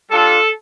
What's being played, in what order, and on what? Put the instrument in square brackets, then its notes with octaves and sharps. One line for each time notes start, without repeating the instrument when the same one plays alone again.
[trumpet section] G3 D4 F4 A4